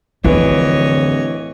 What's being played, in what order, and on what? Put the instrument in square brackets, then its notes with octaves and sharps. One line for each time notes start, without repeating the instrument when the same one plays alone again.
[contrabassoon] D1 [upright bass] F2 D3 [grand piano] E3 [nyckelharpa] C#5 D#5